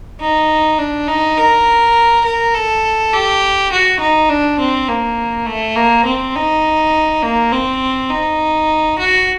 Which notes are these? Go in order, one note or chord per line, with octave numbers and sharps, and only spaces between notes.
D#4
D4
D#4
A#4
A#4
A4
G4
F#4
D#4
D4
C4
A#3
A3
A#3
C4
D#4
A#3
C4
D#4
F#4